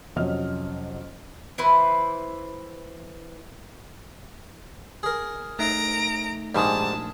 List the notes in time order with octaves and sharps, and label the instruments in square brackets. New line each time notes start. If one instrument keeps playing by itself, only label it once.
[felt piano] F2 C3 F#3 C#4 D#5 F6
[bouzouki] E3 E4 B4 C5
[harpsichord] G#4 A#4
[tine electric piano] A3 D#4 E5 [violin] A#5 D7
[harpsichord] A#1 G#4 [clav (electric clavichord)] G#2 D#3 G3 [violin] A5